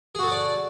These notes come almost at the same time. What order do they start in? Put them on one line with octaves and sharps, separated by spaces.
G#4 F#4 A4 F#5 D5